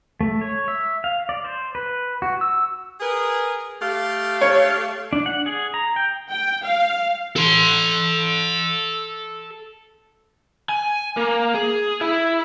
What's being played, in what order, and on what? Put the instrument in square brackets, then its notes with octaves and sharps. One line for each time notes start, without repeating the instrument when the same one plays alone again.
[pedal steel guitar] A3
C#5
E5
F5
D5
C5
B4
F#4
E6
[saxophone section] G#4 A#4 B4
A3 G4 F5
[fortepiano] C#5
[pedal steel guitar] D4
F#5
G#4
A#5
G5
[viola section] G5
F5
[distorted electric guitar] A4 C6
[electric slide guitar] G#5
A#3
G#4
E4